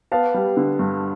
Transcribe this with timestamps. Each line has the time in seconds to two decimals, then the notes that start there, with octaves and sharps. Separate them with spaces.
0.12 B3 F5 A5
0.34 G3
0.57 D3
0.79 G2